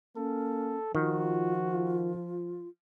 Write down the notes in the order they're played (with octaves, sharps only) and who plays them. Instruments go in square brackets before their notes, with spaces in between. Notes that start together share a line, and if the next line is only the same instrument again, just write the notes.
[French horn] A#3 [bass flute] C#4 [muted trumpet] A4
[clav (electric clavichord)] D#3 [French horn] F3 [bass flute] F4 [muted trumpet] F#4